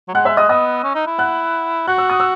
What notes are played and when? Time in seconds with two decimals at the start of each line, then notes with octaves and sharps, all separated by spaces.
0.08 F#3
0.14 G#3 F#5 F#6
0.25 E5 E6
0.37 D#5 D#6
0.49 B3 D#5 D#6
0.84 C#4
0.95 D#4
1.07 E4
1.18 F#5 F#6
1.87 F#4 F#6
1.98 E6
2.10 D#6
2.20 E6